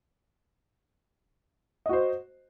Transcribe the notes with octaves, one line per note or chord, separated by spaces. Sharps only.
F#4 C5 D#5